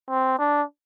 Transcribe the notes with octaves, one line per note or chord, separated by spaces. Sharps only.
C4
D4